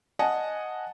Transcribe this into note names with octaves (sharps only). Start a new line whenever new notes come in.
D#5 F#5 G#5 A5 D#6